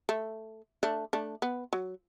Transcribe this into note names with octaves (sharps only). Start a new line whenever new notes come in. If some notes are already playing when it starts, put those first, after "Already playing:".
A3
A3 D4
A3 D4
B3
F#3